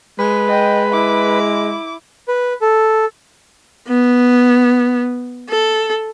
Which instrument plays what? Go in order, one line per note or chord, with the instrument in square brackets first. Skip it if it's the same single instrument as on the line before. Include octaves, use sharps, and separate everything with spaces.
[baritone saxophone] G#3 [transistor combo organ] B4
[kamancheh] D#5 G5
E4 D6
[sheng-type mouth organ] B4
A4
[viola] B3
A4